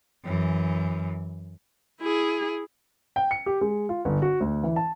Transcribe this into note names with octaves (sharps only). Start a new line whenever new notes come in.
F#2 E3
E4 G#4
G5
C#7
G4
G#3
F4
G1
F#4
D2
E3
A5